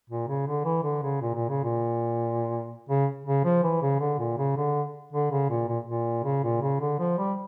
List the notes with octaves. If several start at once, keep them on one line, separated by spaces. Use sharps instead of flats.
A#2
C#3
D3
E3
D3
C#3
A#2
A#2
C#3
A#2
C#3
C#3
F3
E3
C#3
D3
A#2
C#3
D3
D3
C#3
A#2
A#2
A#2
C#3
A#2
C#3
D3
F3
G3